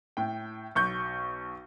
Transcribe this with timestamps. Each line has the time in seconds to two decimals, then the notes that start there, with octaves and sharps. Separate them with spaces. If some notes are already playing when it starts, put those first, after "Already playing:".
0.17 A2 G5
0.75 B1 C#6 G6